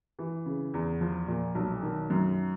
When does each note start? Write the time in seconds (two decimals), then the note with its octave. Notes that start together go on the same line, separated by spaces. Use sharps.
0.19 E3
0.46 C#3
0.74 E2
1.01 F3
1.28 A#2
1.55 B1
1.82 D#3
2.10 F#2